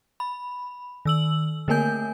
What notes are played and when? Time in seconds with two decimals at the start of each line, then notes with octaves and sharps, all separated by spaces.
0.20 B5
1.05 D#3 E6 F#7
1.68 D3 A3 A#3 A#4 G#5 G6